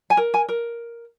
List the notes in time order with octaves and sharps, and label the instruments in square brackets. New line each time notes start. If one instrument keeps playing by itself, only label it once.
[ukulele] G#5
A#4
G#5
A#4